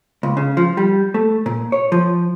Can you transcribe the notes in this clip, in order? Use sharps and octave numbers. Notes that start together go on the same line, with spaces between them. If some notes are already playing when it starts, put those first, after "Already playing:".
C#2
C#3
F3
G3
A3
A#2
C#5
F3